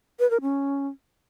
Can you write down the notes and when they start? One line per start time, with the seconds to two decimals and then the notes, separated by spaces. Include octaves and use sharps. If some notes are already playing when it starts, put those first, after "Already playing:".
0.20 B4
0.31 A#4
0.42 C#4